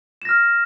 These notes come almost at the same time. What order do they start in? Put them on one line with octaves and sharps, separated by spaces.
E7 A#6 F6